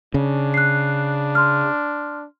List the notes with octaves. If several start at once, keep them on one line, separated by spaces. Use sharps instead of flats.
C#3 D4
F#6 C7
C6 F6